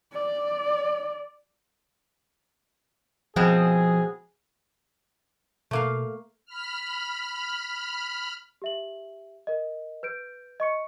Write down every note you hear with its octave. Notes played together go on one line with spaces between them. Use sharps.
D5
B2 F3 G#3 C4 G#4
B2 A3 A#3 F5
B5 F6
G4 E5 F#7
A#4 D#5
B4 G6 D7
D#5 C#6 C#7